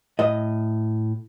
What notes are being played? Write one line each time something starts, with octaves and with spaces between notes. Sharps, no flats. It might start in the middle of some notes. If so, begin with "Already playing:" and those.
A2 D#5